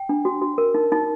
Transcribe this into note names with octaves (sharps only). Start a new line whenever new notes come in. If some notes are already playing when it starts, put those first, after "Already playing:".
Already playing: G5
D4
F#4
F#4
A#4
D#4
D#4